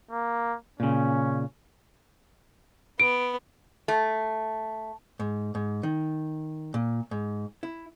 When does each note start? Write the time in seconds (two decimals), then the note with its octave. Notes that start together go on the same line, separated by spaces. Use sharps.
0.11 A#3
0.80 A#2 C#3 C#4
3.00 B3 D7
3.88 A3
5.20 G#2
5.55 G#2
5.83 D#3
6.74 A#2
7.11 G#2
7.63 E4